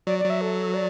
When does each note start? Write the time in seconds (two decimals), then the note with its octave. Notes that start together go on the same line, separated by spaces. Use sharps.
0.07 F#3 D5
0.19 D5
0.24 F#3
0.30 E5
0.41 A4
0.74 D5